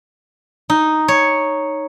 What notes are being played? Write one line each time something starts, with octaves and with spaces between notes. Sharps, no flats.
D#4
C#5